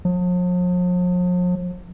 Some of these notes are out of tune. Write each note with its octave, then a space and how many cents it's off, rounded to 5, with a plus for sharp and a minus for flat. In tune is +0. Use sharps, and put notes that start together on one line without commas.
F3 +45